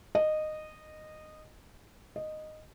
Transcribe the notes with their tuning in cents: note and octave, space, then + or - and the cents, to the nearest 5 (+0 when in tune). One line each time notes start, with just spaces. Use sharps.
D#5 -15
D#5 -10